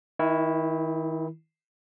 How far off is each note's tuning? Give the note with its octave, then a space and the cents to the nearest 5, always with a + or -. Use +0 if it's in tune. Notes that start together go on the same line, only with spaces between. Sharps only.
D#3 +35 E4 +0